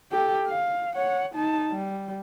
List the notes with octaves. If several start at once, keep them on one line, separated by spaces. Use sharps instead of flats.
G4 A4
F5
C#5 F#5
D#4 A5
G3